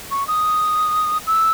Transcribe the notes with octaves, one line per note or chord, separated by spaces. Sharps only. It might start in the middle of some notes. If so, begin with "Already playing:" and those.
C#6
D#6
E6